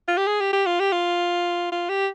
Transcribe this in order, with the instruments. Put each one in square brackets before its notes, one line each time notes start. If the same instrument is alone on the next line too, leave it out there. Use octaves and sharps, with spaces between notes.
[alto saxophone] F4
G4
G#4
G4
G4
F4
G4
F4
F4
G4